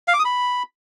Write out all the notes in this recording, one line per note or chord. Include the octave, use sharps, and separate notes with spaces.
F5
D6
D#6
B5